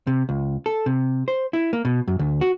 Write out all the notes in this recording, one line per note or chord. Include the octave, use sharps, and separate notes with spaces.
C3
C#2
A4
C3
C5
E4
A#3
B2
F#2
D2
F#4